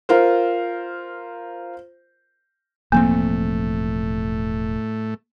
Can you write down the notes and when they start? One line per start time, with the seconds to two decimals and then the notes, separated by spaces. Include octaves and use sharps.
0.09 F4 A#4 C5
2.92 E1 A2 F3 A3 A#3 C4